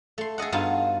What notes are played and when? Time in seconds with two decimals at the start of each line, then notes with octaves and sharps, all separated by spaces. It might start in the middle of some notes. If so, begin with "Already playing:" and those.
0.18 A3 C6
0.38 G#4 A4 D#5 F#5
0.52 G2 B3 D#4 F4 F#4 A5